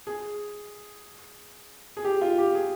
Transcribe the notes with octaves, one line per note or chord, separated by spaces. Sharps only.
G#4
G#4
G4
F4
G4
G#4